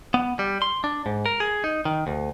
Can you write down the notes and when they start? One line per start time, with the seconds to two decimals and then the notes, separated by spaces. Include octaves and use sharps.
0.14 B3
0.39 G3
0.62 C6
0.84 D4
1.06 G#2
1.26 A#4
1.40 G#4
1.64 D#4
1.85 D#3
2.07 D2